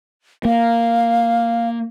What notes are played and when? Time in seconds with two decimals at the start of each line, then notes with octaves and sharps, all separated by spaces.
0.45 A#3 F5